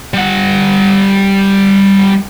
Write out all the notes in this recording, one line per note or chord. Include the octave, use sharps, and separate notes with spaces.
G3 F#5